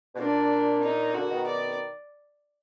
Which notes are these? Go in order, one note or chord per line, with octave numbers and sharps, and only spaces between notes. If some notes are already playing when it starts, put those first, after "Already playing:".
B2
A#2 D4
D#4
A#2 D3 F#4
B2 D#3
D5